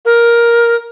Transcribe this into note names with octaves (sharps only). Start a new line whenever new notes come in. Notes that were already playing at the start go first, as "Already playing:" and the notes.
A#4